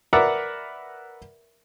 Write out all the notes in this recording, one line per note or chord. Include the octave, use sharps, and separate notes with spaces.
A#4 B4 D5 E5 F#5 A#5